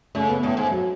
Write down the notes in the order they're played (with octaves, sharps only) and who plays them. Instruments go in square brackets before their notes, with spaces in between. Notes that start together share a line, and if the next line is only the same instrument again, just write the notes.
[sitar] C#3 [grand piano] A3
[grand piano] B3
[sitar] A2 [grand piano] A3
[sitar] G#2
[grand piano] F#3